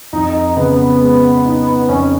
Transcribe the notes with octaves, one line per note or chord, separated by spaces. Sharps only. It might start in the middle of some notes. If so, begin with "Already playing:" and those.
F2 D#4
C#3 B3
G#3
D#4
F2 C#4